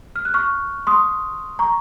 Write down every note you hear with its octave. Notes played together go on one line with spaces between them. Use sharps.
F6
F#6
C#6 F6
C6 D#6
A#5 C#6